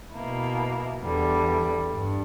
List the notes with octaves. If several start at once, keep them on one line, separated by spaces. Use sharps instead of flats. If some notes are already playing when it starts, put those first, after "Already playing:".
B2 A#3 E4
E2 D3 G3
G2